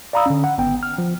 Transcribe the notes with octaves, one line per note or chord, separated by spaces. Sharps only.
D5 F5 A#5 B5 D#6 E6
D3 C#4
F#5
G#1 B3 G5
F6
F3